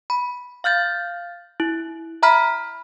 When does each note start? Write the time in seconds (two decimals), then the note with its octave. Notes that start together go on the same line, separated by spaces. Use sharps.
0.10 B5
0.64 F5 F6 G6 A6
1.60 E4
2.23 E5 A#5 B5 F6 B6